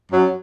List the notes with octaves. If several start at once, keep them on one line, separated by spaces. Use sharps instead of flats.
F#2 F#3